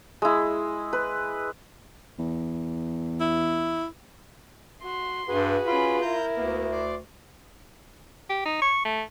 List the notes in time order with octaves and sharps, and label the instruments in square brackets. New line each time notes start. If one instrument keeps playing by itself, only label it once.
[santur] G#3 E4
B4
[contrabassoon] E2
[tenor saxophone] E4
[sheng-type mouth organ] F#4 [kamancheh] C6
[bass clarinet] G2 [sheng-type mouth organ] F#4 G#4 B4
[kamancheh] C#4 B5 [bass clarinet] F4
[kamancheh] E4 A#4 [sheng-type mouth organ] A#5 G6
[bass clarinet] D2 [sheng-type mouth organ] A#3 B3
[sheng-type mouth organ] D5 C6 D6
[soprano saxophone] G4
D#4
C#6
A3